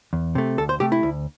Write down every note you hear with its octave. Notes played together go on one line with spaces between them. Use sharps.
E2
C3 A3
D2 A4
C5
C3 A3 G4
E4
D2